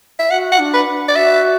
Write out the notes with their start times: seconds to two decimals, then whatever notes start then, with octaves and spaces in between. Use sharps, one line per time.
0.19 E5
0.30 F#4 F#5
0.52 F#5
0.59 D4
0.73 B4
1.08 D5
1.16 F#4 E5